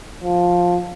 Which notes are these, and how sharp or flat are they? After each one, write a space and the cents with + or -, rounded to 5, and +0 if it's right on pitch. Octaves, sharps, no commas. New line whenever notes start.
F3 +10